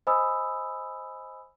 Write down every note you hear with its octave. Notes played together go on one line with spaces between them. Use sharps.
C5 D#5 G#5 B5 D#6 E6